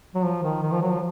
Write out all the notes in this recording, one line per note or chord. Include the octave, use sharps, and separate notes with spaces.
F#3
F3
D#3
D#3
F3
F#3
F3